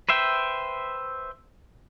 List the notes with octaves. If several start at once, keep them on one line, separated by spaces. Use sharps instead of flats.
B4 C5 E5 G5